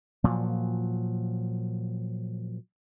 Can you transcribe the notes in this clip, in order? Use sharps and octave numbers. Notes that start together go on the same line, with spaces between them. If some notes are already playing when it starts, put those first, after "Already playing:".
A#2 F3 F#3